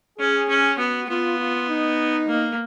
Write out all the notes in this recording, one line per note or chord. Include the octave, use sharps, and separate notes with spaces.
C#4 G#4
C#4
B3 F#4
B3 F4
F4
D#4
A#3